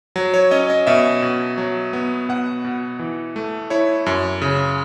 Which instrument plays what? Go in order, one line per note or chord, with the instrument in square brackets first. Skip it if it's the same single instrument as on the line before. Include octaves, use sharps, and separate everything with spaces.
[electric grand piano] F#3
C#5
C#4 D#5
D#5
B2 E5
B2
F#3
B3
B2 F#5
B2
E3
A3
E4 C#5
F#2
C#3